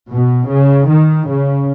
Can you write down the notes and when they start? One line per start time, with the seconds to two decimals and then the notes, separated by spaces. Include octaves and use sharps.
0.11 B2
0.49 C#3
0.89 D#3
1.28 C#3